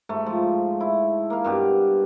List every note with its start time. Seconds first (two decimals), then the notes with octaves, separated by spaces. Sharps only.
0.09 G#2 A3
0.26 F3
0.80 E4
1.30 A#3 F5
1.44 G2 B2 G4